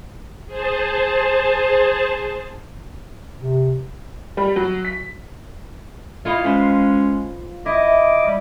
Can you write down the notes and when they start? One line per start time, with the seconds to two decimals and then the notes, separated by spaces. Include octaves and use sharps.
0.47 G#4 C5 A5
3.40 C3
4.37 G3
4.56 F#3
4.85 B6
6.25 E4 F4 C#5 D#5
6.44 G#3 C#4 B4 C5
7.66 E4 D#5 D6
8.26 G3